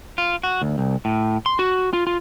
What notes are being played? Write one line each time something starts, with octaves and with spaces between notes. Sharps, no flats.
F4
F#4
D2
C2
A2
C6
F#4
F4
F4